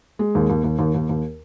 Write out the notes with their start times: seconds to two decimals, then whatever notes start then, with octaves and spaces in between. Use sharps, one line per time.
0.19 G#3
0.35 D#2
0.50 D#2
0.64 D#2
0.79 D#2
0.95 D#2
1.09 D#2